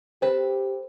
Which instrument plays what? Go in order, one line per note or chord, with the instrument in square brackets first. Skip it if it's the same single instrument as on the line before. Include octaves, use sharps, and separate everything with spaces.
[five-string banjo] C4 A4 B4 [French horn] G4 [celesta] C5